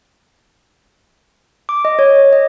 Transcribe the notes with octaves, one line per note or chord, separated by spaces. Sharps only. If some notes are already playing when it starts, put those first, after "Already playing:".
D6
D#5
C#5
D#5